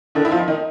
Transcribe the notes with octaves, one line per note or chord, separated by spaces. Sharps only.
D3 D#3 D4
E4
F3 F4
D#3 D#4